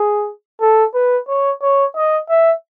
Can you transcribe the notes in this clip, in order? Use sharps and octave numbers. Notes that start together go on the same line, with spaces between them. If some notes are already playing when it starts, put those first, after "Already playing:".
Already playing: G#4
A4
B4
C#5
C#5
D#5
E5